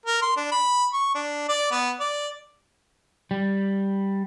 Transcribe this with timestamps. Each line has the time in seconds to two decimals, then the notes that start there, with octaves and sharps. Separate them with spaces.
0.06 A#4
0.22 C6
0.36 D4
0.52 B5
0.93 C#6
1.15 D4
1.49 D5
1.71 B3
2.00 D5
3.31 G3